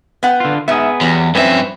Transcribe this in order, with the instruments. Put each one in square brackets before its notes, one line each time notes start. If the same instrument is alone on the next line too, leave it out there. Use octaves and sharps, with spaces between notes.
[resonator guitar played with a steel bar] B3 F#5 G5
[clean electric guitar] D3 F4
[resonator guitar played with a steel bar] G#2 E5 [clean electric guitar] B3 G#4
[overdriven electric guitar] E2 [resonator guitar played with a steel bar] F#3 G3
[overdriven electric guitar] G2 E5 [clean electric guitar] F3 C4 C#4 [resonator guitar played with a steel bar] B4